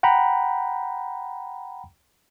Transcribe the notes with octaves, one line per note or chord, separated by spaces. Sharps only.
F#5 G5 A#5 B5